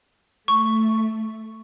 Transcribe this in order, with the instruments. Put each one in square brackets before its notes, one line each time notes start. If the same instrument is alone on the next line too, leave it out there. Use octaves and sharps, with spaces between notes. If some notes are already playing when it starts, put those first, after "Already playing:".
[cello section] A3 [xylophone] C#6